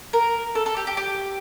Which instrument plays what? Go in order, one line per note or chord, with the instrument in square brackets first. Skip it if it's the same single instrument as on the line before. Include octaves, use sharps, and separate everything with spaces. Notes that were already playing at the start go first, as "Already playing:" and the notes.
[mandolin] A#4
A4
A4
G4
G4
G4